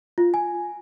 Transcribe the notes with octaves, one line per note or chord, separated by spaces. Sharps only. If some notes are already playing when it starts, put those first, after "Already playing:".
F4
G#5